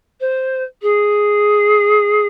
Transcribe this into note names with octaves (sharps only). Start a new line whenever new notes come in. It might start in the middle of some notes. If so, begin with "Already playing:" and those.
C5
G#4